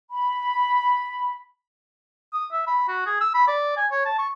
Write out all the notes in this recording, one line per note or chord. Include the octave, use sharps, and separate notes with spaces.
B5
D#6
E5
B5
F#4
G#4
E6
B5
D5
G#5
C#5
A5
C#6